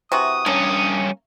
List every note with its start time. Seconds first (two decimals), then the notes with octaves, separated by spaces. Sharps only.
0.12 C3 E3 F#4 D#6
0.46 G2 A#3 C#4